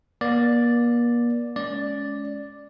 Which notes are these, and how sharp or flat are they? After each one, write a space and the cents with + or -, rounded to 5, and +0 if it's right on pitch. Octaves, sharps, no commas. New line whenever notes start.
A#3 +40 D5 +0
G#3 +30 C#4 +20 D5 +0